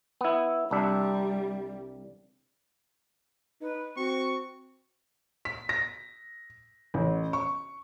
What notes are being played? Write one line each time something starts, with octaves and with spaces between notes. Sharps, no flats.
B3 E4
C2 G3 D4 E5
D#4 B4
C4 F#4 C#6
B6
A#6
A1
C#6